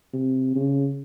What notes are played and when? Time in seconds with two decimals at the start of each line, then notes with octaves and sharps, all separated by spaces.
0.13 C3
0.56 C#3